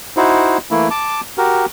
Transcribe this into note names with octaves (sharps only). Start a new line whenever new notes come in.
D#4 E4 F#4 C5
E3 A3 A#3 E4
A5 D6
F#4 G4 A#4